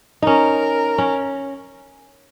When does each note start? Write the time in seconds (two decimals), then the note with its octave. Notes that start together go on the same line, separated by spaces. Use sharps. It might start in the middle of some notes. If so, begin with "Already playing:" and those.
0.22 C#4 D#4 A#4
0.98 C#4